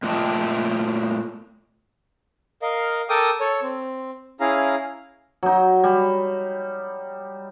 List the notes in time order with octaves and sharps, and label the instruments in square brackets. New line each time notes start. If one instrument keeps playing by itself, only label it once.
[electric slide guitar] A#2 A3 F4 D#5 G5 A5
[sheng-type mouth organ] A#4 D#5 F5
A4 A#4 G5 D6 D#6
A4 C#5
C4
C#4 E4 G#4 F5 A#5
[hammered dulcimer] F#3 D#4
G3